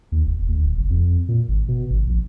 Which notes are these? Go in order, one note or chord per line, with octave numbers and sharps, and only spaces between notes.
D#2
E1
D2
D#1
F#1
F2
A#2
G#1
B2
G#1
A#1